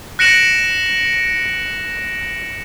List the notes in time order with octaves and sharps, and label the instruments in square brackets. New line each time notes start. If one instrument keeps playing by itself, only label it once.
[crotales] F#6 A#6 C#7 D7 E7 F#7